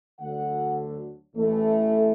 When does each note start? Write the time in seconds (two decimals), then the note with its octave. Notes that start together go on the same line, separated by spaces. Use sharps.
0.19 D2 D3 F#3 D4 F#5
1.34 A1 A2 E3 A3